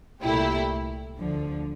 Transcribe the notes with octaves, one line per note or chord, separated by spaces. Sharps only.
C2 A#2 A3 E4 G4
D2 D3 F3